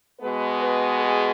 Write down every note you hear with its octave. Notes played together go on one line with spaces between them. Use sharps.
B2 G#3 B3 B4
B4
G#4